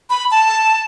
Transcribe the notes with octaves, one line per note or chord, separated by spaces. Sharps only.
B5
A5